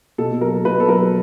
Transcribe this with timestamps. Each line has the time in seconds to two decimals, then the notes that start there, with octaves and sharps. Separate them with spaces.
0.18 B2 A4
0.41 F#3 A#4
0.65 B2 B4
0.80 A4
0.88 F#3 A#4